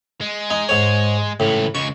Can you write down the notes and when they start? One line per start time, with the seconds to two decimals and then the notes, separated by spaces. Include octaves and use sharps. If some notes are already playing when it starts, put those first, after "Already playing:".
0.21 G#3
0.50 D#4
0.69 G#2 C#5
1.40 C#2 A2 E3
1.75 C#2 G#3 C#6